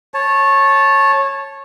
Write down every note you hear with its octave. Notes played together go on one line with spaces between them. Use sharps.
C#5 A5